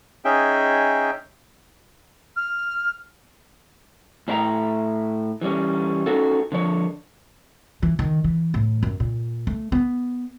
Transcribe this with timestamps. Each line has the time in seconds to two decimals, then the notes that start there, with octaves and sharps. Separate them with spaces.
0.25 C#4 D#4 G#4 E5 G5
2.36 F6
4.28 A2 D4 E4 G5 A#5
5.41 E3 G3 C#4
6.06 C#4 D#4 F#4 A4
6.52 D3 F3 C#5
7.83 E3
7.99 D#3
8.24 E3
8.54 A2
8.83 F#2
9.00 A#2
9.47 A3
9.72 B3